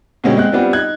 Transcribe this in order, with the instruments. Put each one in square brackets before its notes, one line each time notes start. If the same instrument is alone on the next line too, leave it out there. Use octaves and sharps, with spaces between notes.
[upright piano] B2 D3 G3 G#3 C4 C#4
G#3 C4 F#6
G3 B3 C4 D4 F4
D#4 F#6 G#6